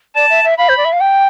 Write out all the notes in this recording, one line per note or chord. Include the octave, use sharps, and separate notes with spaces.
D5 A5
E5
E5
F5 B5
C5
D5
E5
F5
G5